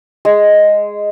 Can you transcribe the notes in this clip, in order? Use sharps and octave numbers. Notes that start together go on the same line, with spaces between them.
G#3